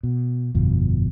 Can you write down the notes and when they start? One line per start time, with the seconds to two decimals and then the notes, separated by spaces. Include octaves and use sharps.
0.03 B2
0.55 G1 F2 B2 F3